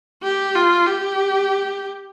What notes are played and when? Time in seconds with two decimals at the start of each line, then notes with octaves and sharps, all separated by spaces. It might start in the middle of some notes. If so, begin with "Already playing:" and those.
0.23 G4
0.55 F4
0.87 G4